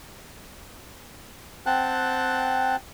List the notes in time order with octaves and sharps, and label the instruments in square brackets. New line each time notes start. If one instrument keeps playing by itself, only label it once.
[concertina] C4 F#5 G5 A5 F#6